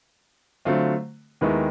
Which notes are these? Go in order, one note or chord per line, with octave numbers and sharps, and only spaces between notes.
D3 F#3 A3 C4 F4
D#2 D#3 G#3 B3 E4